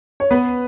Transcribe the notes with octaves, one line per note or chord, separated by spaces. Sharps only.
C#5
B3 B4